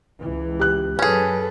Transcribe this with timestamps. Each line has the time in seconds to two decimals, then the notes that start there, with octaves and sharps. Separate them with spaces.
0.20 C#2 E3
0.59 G4 F#6
0.99 F#2 C#4 G#4 A4 B4